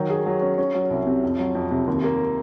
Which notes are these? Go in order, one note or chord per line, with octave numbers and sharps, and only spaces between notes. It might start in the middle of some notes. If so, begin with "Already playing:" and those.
Already playing: D#3 F#3
G#4
F#3
C#4
C#4
F#3
C2
C3
F2
F#3
F2
C3
D#2
A#3